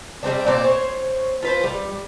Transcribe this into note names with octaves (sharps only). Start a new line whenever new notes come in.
G3 A3 C4 D4
A#2 C4 D5
C5 C#5
F4 B4 C5
G3